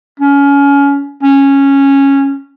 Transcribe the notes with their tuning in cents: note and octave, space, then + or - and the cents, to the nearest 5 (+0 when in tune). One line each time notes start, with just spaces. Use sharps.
C#4 +25
C#4 -10